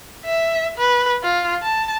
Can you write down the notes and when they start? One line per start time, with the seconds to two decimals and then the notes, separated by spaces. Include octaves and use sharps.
0.25 E5
0.77 B4
1.23 F4
1.63 A5